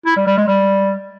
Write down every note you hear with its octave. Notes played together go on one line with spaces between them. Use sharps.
E4
G3
G3
G#3
G3